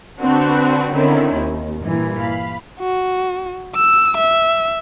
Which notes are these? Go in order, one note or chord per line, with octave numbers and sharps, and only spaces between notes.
D3 C4 D4 F#4 B4
D3 D#3 C4 C#4 E4
D#2
G2 A#2 E3
F5 B5
F#4
E6
E5